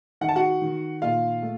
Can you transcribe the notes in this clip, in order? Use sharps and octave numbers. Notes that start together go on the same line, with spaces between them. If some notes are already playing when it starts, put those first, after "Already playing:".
D#3 F#5
A5
F#4 F#5
D#3
A#2 F4 F5
A3